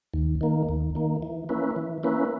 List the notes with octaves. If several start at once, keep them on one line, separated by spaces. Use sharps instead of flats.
D#2
D#3 A#3
D#2
D#3 A#3
E3
A#3 C#4 E4 B4
E3
A#3 C#4 E4 B4